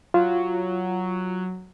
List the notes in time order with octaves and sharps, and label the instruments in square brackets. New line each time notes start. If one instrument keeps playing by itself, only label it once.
[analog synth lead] F#3 [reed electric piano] F4